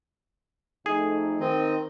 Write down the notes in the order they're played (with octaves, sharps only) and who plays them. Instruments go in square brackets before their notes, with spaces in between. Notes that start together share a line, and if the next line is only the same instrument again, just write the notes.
[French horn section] F2 A3 D#4 [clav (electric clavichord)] G#4
[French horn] D#3 [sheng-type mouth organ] C4 D#5